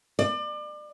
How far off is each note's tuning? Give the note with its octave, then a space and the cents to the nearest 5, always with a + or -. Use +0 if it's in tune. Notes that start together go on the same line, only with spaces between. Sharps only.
D5 +35